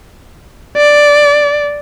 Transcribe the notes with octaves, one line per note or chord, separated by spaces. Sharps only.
D5